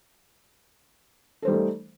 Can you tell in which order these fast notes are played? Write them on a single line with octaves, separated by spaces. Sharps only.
A4 C5 G3 D#4 A3